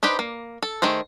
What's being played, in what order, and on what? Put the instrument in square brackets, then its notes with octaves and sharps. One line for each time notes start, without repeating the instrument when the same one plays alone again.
[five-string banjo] D4 D#4 G4 B4 C5
A#3
A4
D#3 A3 G#4 C5